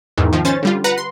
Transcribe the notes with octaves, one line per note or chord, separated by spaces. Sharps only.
E2 G#2 D#3 E3
D#3 F3
C#4 C5 A6
D3 G3 F4
B4 F#5 A#5
C6